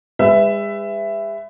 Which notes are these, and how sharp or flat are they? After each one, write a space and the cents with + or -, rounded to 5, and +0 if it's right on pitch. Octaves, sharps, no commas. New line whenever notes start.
G#3 -40 B4 +25 E5 +10